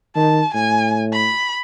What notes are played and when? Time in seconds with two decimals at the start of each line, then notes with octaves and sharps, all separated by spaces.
0.16 D#3 A5
0.54 A2 G#5
1.13 B5